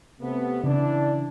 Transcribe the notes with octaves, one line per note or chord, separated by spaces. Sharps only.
C3 A3 B3
C#3 E3 D4